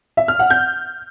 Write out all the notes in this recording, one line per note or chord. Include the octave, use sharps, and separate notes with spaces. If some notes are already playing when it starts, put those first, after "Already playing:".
E5
F6
F#5
G6